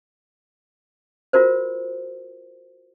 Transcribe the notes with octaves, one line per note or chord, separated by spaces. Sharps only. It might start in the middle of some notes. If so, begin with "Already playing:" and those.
F4 F#4 A#4 C5